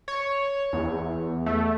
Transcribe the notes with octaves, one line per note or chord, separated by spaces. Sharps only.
C#5
E2
A3